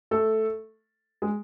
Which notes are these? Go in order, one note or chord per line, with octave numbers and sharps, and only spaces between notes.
A3 A4
G#3 G#4